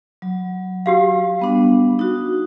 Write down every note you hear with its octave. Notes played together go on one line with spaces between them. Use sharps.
F#3
F#4 G4 F5
G3 B3 D4
D#4 F#4